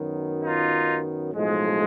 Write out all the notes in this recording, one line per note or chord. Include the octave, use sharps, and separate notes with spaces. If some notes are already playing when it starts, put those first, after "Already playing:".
Already playing: F#2 D#3 F#3 B3
D#4 F4
B1 A2 F3 G#3